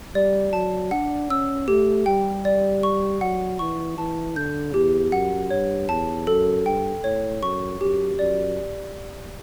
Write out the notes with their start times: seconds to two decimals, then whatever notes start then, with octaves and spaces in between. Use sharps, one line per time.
0.15 G3 D5
0.53 F#3 A5
0.91 D4 F#5
1.30 C#4 E6
1.68 A3 G4
2.06 G3 G5
2.45 D5
2.83 C#6
3.21 F#3 F#5
3.59 E3 C#6
3.98 E3 A5
4.36 D3 G6
4.74 E2 G4
5.12 F#2 F#5
5.50 G2 C#5
5.89 E2 A5
6.27 F#2 A4
6.65 G2 G5
7.04 A2 C#5
7.42 F#2 C#6
7.80 F#2 G4
8.19 F#2 D5